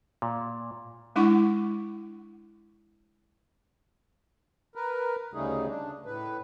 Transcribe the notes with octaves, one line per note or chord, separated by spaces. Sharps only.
A#2
G#3 D4 E4 F#5 C#6
A#4 B4
D2 C#3 G3 A3 D#4 G#4
D4
A2 B4